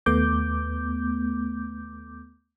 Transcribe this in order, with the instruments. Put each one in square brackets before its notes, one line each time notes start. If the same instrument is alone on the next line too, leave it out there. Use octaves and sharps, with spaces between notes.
[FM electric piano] D#2 A3 B3 D6 G6